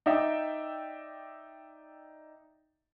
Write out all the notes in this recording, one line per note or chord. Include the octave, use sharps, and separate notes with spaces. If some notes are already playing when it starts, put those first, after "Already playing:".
D#4 D5 E5 G5